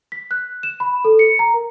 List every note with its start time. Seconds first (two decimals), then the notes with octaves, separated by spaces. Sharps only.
0.12 B6
0.31 F#6
0.63 E7
0.80 B5
1.05 A4
1.19 C#7
1.39 A#5
1.54 A#4